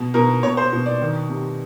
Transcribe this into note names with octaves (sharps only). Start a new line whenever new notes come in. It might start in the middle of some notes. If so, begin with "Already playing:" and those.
Already playing: B2
B2 A#4
B2 C#5
C5
B2
D5
D#3
C3